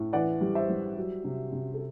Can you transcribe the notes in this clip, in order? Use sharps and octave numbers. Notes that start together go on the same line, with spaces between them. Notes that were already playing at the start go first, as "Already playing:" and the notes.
Already playing: A2
E3 D5 F#5
G3
C5 E5
G3
F#3
C3
C3
A4